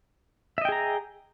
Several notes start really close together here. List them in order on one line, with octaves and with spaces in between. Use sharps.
E5 D#5 G5 G#4 A#5